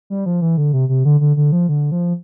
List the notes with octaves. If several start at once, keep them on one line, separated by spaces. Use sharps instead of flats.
G3
F3
E3
D3
C3
C3
D3
D3
D3
F3
D3
F3